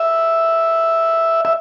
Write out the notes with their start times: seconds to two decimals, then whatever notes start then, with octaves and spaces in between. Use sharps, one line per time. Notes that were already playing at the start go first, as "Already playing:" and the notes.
Already playing: E5
1.45 E5